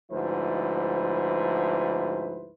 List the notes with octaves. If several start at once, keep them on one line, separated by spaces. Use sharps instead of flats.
D2 G#2 F3 E4 B4 C5